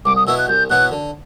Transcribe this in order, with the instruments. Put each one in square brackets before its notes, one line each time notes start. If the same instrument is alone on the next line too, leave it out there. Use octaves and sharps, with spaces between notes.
[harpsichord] C2 [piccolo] D6
[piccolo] D#6
[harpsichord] B2 F#3 B3 E4 [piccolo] E6
[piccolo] F#6
[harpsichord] C2 [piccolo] G6
[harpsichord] B2 F#3 B3 E4 [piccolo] F#6
[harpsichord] D3